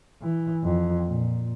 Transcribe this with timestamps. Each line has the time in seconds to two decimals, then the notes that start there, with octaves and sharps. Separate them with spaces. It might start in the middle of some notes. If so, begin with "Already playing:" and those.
0.22 E3
0.64 F2
1.08 A#2